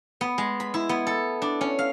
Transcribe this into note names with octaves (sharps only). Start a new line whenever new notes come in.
B3
G#3
B5
E4
B3
A4
D4
C#4
F5